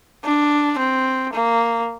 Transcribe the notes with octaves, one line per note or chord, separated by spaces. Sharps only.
D4
C4
A#3